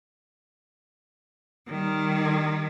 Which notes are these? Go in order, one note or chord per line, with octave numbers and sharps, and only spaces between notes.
D#3 G3